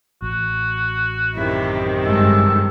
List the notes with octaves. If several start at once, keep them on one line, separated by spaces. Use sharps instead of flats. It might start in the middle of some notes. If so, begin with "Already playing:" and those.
A1 F#4
F#2 C3 D#3 E4
G2 G#3 A4